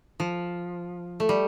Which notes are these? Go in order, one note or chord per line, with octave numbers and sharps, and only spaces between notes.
F3
A3
G3